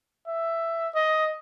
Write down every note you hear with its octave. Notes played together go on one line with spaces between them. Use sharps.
E5
D#5